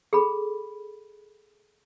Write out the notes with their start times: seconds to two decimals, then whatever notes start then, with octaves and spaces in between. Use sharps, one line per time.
0.13 G#4 A4 B5